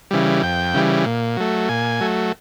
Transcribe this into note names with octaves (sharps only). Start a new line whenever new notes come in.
C#3 E3 G3
F2 G5
C#3 E3 G3
A#2
F#3 A3
A#2 G#5
F#3 A3